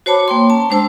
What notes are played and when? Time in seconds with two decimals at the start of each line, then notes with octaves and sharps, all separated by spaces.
0.06 F#4 C5 C#5 A5 B5 D6
0.28 A#3 G5 C6
0.50 C#4 A5
0.70 G#3 D4 C5 A5 E6